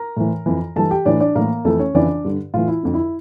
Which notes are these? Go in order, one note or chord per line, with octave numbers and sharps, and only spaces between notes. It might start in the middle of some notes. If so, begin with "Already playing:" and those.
Already playing: A#4 A#5
A2 E3
F2 E3
G2 E3 A4 A5
G4 G5
A2 E3 D4 D5
D4 D5
A2 E3 A#3 A#4
F2 E3 A3 A4
C#4 C#5
F2 C#3 E3 D4 D5
G2 D3
A2 E3 F4
E4
F2 D3
E4